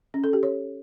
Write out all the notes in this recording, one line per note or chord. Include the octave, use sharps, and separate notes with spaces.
C#4
A4
G4
C#5